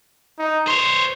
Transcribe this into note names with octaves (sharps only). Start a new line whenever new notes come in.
D#4
C5 C#5 C6